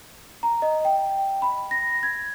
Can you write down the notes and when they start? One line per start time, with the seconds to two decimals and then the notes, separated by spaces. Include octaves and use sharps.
0.43 A#5
0.62 D#5
0.85 G5
1.42 B5
1.71 A#6
2.03 G#6